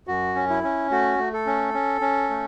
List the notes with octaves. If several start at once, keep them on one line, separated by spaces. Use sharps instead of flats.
F#2 F#4
C#4
E4
C#4
A3 F#4
A3
A4
C#4
C#4
C#4
A3